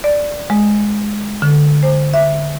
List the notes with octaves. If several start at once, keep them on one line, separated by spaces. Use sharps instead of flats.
D5
G#3
D3
C5
E5